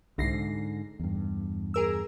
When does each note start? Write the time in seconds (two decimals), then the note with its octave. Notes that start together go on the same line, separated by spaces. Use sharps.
0.18 C2 G#2 D3 A#6 C7
1.00 E2 G2
1.74 G#4 A#4 E6